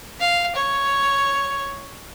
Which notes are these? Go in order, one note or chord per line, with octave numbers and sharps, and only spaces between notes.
F5
C#5